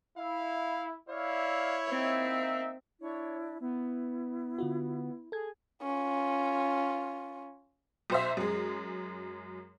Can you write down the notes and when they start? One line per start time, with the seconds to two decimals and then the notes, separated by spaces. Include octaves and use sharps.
0.17 E4 F5
1.09 E4 C#5 D5 E5 F5
1.88 A#3 C4 D#4 E5
3.01 D4 E4 C#5
3.60 B3 E4
4.58 D3 F4 F#4
5.32 G#4 A4 G#6
5.83 C#4 F4
8.10 B1 C5 E5
8.37 F#2 G#3